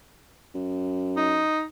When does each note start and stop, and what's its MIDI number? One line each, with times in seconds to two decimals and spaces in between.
0.55 1.44 42
1.16 1.63 63